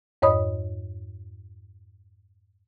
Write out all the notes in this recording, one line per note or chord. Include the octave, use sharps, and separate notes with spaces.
F2 G#2 C#5 D#5 B5 D#6